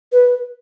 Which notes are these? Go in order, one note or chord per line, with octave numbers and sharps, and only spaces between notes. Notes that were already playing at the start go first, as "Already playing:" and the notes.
B4